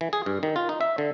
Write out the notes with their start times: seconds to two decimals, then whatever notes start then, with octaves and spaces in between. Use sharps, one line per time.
0.01 E3
0.13 G#4
0.26 G2
0.43 D#3
0.56 F4
0.69 D#4
0.81 E5
0.98 D3